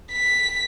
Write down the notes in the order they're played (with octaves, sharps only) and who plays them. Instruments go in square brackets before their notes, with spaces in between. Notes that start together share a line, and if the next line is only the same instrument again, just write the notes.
[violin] B6